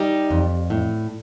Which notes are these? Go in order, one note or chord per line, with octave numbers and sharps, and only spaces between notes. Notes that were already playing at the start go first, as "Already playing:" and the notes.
Already playing: G3 D#4 G4
F2
A2